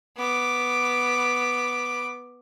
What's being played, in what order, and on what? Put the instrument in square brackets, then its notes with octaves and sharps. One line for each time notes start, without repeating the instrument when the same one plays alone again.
[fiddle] B3 D6